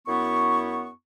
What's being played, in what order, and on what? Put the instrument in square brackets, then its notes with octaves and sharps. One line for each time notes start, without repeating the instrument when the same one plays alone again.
[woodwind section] F#2 B3 E4 C#6